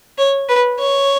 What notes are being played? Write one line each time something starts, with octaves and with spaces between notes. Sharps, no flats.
C#5
B4
C#5